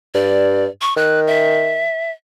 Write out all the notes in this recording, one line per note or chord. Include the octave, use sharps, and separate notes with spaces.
G2 D5
C#6
D#3 F#6
E5